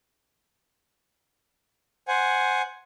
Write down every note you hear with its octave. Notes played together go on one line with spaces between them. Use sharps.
C5 F#5 G#5